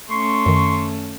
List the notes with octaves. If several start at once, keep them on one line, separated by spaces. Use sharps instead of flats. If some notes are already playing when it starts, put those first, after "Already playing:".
A3 C#4 C6 C#6
F#2 D#3